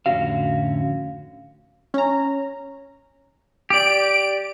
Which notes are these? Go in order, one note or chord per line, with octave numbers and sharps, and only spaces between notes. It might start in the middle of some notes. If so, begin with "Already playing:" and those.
F2 A2 D3 C#4 F#4 F5
C#4 A#5
G4 D5 D7